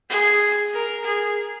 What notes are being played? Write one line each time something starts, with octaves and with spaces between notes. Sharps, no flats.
G#4
A#4
G#4